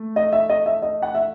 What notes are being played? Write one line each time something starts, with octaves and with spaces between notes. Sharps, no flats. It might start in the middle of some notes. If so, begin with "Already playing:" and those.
Already playing: A3
D#5
E5
D#5
E5
D#5
F#5
E5